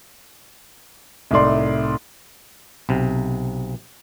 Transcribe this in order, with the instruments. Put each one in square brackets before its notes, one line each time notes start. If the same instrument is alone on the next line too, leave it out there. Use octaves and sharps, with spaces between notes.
[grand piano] C2 A2 D#4 D5 C6
[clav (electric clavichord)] B1 C3